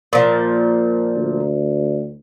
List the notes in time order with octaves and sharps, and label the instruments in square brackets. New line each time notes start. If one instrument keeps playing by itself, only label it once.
[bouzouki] A#2 F3
[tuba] D2